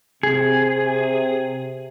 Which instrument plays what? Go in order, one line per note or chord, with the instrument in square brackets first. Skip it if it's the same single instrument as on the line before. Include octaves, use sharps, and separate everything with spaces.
[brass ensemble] C3 [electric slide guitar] G#4